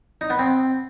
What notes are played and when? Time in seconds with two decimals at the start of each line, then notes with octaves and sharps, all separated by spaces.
0.21 D#4
0.30 B3
0.39 C4